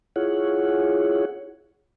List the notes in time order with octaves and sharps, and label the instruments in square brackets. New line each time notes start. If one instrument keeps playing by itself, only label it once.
[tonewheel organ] E4 F4 G#4 C#5 F#5